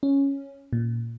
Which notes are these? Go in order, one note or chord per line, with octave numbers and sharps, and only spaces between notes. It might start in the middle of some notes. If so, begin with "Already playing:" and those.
C#4
A#2